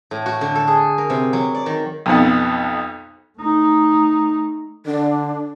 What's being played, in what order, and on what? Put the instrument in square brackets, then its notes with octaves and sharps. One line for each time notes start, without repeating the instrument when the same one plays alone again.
[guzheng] A2
F#4
D3
A4
G#4
A#4
C3
F#3
D5
D#3
[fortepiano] B1 F2 B3
[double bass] A3 D#4
[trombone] D3 [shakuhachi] D4